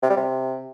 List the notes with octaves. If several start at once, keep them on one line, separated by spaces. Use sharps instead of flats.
C3
G3
C3